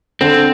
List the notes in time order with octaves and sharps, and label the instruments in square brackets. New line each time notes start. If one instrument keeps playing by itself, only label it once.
[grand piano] D3 [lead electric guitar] C4